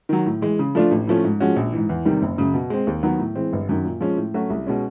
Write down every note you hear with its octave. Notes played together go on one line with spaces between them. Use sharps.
D#3 F#3
A2
E3 G#3
C#3
F3 A3 D4 F4
A1
A2 F3 A3 C#4
G#2
F3 G#3 C#4 F#4
A#1
G#2 E3
E2
C3 D#3 G3
F#1
F#2 C#3
B2
G#3 C4
D#2
D#3 F#3 B3
A2
E3 G#3 C4
G1
F#2 D#3
A#2
F3 G#3 C#4
A2
F#3 A3 C#4 F#4
C2
B2 G#3 C#4